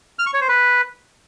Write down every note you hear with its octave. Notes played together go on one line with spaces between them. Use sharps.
F6
C#6
C#5
C5
B4